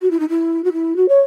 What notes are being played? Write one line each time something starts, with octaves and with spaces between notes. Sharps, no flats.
F#4
E4
D#4
E4
F#4
E4
F#4
C#5